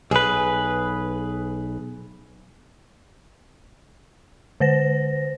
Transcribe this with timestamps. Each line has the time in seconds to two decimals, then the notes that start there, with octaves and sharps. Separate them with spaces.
0.11 B1 G#4 B4
4.60 D3 C5 A#6